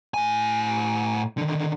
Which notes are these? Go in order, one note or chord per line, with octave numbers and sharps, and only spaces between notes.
A2 G#5
D3 D#3